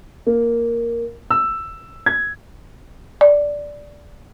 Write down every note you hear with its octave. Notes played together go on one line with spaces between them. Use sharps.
A#3
E6
G#6
D5